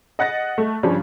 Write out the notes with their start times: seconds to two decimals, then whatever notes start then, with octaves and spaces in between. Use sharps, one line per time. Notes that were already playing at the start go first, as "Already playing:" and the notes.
0.19 D#5 F#5 F#6 A6 A#6
0.58 A3
0.83 G2 C#3 F3 G3 C#4 D4